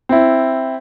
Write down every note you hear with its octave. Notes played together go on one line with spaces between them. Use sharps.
C4 E4